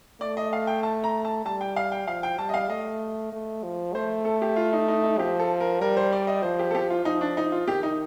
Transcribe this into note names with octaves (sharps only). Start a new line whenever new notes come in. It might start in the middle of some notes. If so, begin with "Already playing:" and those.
A3 D5
D#5
F5
G5
A5
A#5
A5
G3 A5
G5
F5
G5
F3 F5
G5
G3 A5
D#5
F5
A3 D#5
A3
F3
A3 C5
A4
G4
F4
D#4
D#4
D#4
F3 G4
A4
A#4
G3 A#4
C5
D5
D#5
F3 C5
G4
A4
G4
F4
F3 D#4
D4
D#4
F4
D#3 G4
D#4